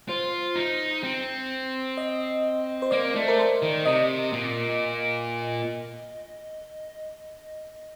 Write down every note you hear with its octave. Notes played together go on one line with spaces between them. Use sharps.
F4 C5
D#4
C4
D#5
C5
A#3 D5
A3
A#4
C5
D#3
C3 D#5
A#2